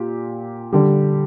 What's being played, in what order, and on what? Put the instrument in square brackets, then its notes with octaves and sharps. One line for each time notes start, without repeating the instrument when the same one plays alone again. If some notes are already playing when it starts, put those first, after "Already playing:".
Already playing: [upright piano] A#2 G4
D3 G3 G4